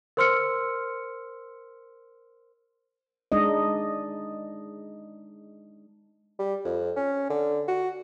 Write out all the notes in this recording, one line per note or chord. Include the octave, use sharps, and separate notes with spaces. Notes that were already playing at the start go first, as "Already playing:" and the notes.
A#4 C5 C6 E6 F6 C#7
G#3 D4 D#4 D#5
G3
F2
C#4
D3
F#4